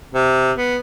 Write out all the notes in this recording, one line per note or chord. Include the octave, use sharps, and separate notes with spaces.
C3
B3